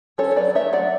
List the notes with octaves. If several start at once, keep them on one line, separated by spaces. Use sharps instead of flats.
C#4 A4 C#5
C#5
F#3 B4 D5
A3 C#5 E5
F#3 D5 F#5